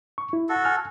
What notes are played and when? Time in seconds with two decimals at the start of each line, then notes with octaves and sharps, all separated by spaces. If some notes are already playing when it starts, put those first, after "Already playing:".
0.18 C#6
0.33 E4
0.49 F#4 A4
0.65 G#5 F6